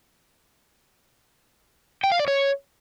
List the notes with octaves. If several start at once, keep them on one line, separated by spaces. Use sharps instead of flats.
G5
F5
D5
C#5